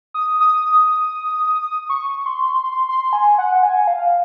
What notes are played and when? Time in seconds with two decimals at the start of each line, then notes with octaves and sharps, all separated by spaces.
0.14 D#6
0.40 D#6
1.89 C#6
2.26 C6
2.63 C6
2.89 C6
3.13 G#5
3.38 F#5
3.63 G#5
3.88 F5